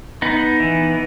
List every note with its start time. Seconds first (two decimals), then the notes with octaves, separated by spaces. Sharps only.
0.22 B3 D#4
0.60 E3